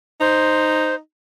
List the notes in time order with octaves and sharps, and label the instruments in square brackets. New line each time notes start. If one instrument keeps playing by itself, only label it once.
[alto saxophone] D#4 [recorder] C5